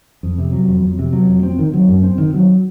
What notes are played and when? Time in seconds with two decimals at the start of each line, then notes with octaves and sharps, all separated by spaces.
0.23 F2
0.38 C3
0.53 F#3
0.68 F2
0.83 F2
0.99 C3
1.13 F#3
1.28 F2
1.43 C4
1.59 D#3
1.73 F#3
1.88 F#2
2.03 C4
2.18 D#3
2.34 F#3